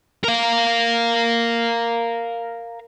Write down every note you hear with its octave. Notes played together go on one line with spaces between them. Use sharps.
A#4 F5